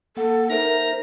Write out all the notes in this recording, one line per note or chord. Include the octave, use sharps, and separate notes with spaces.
A#3 A4 F#5
D#4 A#4 C5 E5 A#5